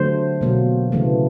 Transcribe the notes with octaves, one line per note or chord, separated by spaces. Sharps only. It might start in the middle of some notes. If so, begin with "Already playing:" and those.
Already playing: D3 F#3 A3 C5
B2 F#3 A#3
C#3 E3 A3